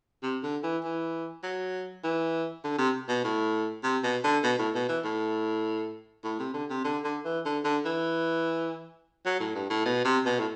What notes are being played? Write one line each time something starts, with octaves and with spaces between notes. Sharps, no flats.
C3
D3
E3
E3
F#3
E3
D3
C3
B2
A2
C3
B2
D3
B2
A2
B2
E3
A2
A2
C3
D3
C3
D3
D3
E3
D3
D3
E3
F#3
A2
G2
A2
B2
C3
B2
A2